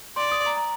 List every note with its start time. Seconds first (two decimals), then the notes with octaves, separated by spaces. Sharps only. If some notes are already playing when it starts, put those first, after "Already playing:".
0.16 D5 C6
0.31 D#6
0.46 A#5
0.57 A#5